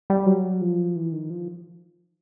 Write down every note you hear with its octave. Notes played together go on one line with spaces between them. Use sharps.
G3
F#3
F3
E3
D#3
F3